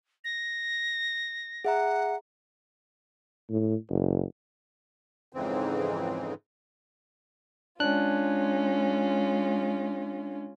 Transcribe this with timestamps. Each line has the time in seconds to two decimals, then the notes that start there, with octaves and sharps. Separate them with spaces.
0.24 A#6
1.65 G#4 E5 F#5 A#5
3.50 A2
3.89 F#1
5.33 F2 G#2 C#3 E3 C4
7.80 G#3 C#4 D4 F4 F#6